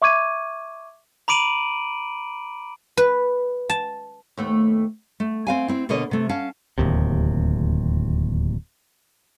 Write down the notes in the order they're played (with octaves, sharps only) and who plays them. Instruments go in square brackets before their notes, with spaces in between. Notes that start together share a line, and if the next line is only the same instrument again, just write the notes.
[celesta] E5 C#6 D6 G#6 D#7
[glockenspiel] A#5 B5 D6 D7 D#7 F#7
[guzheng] B4
A5
[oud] D#2 A3 B3
[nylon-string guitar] A3
C4 F5 G#5
C4 E4
B2 D3 A#3 C#5 D#5
C3 A3
C#4 F5 A5
[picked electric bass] D1 D#2 C3